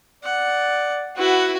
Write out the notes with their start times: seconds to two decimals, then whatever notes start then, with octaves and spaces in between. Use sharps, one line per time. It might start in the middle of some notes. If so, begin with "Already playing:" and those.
0.23 D5 F#5
1.17 E4 F#4 B4 F#5